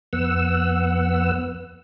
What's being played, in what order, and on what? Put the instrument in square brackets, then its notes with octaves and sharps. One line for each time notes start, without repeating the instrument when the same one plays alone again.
[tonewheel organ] F2 B3 F#5 E6